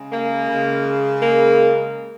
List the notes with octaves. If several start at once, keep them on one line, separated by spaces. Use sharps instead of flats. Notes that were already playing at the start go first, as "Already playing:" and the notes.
Already playing: C#3 G#3
A#3
C#3 G#3
A#3